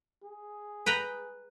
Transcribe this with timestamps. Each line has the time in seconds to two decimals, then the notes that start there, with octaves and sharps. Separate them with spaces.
0.23 G#4
0.86 B4 G5 A#5